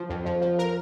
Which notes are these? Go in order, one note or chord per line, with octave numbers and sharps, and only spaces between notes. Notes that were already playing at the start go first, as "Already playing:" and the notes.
Already playing: F3 F4
F2
F3
F3
A#4